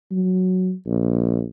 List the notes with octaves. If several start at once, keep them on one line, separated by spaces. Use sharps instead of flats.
F#3
A#1